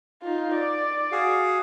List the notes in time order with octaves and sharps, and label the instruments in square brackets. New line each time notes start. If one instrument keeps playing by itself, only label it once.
[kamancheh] D#4 F4
D5
[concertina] F#4 G#4 F5